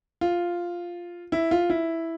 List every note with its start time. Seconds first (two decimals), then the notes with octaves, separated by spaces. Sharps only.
0.21 F4
1.32 E4
1.51 F4
1.70 E4